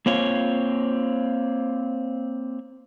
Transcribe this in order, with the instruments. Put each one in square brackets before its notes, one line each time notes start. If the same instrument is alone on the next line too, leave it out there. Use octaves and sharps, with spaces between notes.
[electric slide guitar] A#3 C4 F4 C#5